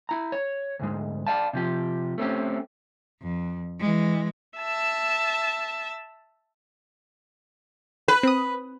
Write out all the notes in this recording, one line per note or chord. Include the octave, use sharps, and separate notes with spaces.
E4 A#5
C#5
D2 G#2 G#3
D5 F5 A5
C3 F3 G4
A3 C4 C#4 G4
F2
E3 G#3
E5 A5
B4
C4 D#6